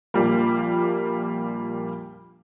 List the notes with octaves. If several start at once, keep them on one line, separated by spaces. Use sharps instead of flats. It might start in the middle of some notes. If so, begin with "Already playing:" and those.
A#1 A#2 G3 A#3